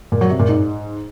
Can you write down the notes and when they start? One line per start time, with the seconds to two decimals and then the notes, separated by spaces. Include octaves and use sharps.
0.12 A#2
0.21 F#3
0.30 C3
0.39 A#2
0.49 G#2